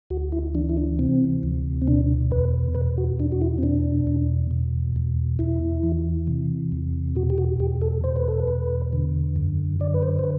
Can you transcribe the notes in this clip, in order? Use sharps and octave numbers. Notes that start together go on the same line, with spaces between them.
D2 F#4
E4
E3 D4
E4
D4
C3 C4
D2
C4
B2 D4
E2 B4
B2 B4
F#4
E2 D4
F#4
E4
C4
B2 D4
E2
B2
E2
E2 E4
E3
C3
E2
B2 F#4
G4
F#4
E2 G4
A4
B2 C5
B4
A4
B4
E2
D3
F#2
D3 D5
B4
C5
C5
B4